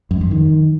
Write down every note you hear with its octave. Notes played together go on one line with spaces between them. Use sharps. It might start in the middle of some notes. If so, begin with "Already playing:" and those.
F#2
F2
D#3